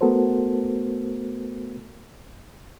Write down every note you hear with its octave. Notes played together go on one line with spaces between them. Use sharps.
A3 B3 F#4 A4 A#4 C5